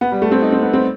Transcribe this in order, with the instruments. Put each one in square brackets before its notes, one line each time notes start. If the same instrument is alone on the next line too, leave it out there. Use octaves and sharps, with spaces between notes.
[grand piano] B3
G3
A3
C4
D#4
C4
B3
C4